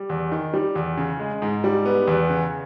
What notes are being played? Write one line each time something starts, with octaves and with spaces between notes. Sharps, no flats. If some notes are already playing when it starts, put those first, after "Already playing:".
Already playing: G3
E2
D#3
G3
E2
C#3
G#3
G#2
G3
B3
E2
C#3